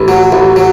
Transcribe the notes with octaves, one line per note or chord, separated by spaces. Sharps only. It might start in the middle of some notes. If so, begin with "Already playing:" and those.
Already playing: A1
F#3
A1
F#3